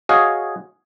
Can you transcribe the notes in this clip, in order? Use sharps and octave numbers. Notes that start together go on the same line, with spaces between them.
F#4 G#4 C#5 D#5 F5